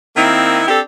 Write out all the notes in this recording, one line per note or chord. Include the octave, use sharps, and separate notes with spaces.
D#3 A#3 C4 E4
C4 D4 G4 A4